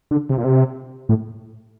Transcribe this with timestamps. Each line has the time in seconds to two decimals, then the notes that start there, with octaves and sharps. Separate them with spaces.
0.11 D3
0.29 C3
0.38 A#2
0.44 C3
1.09 A2